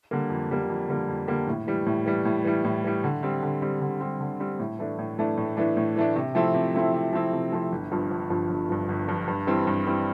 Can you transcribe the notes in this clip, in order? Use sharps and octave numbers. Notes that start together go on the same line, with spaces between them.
D3 G3 A#3
F2
D3 G3 A#3
F2
D3 G3 A#3
F2
D3 G3 A#3
A2
E3 G3
A2
E3 G3
A2
E3 G3
A2
E3 G3
D3
G3 C4
D3
G3 C4
D3
G3 C4
D3
G3 C4
A2
E3 A3 D4
A2
E3 A3 D4
A2
E3 A3 D4
A2
E3 A3 D4
C3
F3 A3 C4 E4
C3
F3 A3 C4 E4
C3
F3 A3 C4 E4
C3
F3 A3 C4 E4
G1
G2 F3
G1
G2 F3
G1
G2 F3
G1
G2 F3
G2
E3 G3 C4
G2
E3 G3 C4